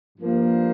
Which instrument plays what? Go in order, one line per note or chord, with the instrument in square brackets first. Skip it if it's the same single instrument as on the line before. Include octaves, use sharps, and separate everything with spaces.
[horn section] G2 F3 A#3